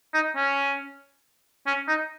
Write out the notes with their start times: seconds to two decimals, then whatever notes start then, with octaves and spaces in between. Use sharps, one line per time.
0.14 D#4
0.36 C#4
1.67 C#4
1.88 D#4